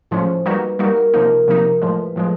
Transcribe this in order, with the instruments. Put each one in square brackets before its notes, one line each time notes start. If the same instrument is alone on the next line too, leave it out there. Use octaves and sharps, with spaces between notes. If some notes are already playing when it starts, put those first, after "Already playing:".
[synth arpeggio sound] A2 F3 G#3 C#4 [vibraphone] C5
[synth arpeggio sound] G3 A#3 D#4 F#4 [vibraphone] B4
[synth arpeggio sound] G3 A#3 D#4 F#4 [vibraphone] A#4
[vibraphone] A#4
[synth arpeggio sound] C3 F3 A#3 D#4
C3 F3 A#3 D#4
[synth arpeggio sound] A2 F3 G#3 [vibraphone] A#4
[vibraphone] B4
[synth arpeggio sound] A2 F3 G#3 [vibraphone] B4